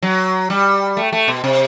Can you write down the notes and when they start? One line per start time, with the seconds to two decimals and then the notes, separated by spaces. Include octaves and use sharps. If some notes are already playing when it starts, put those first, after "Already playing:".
0.02 F#3
0.50 G3
0.97 A3
1.13 A3
1.28 B2
1.44 C3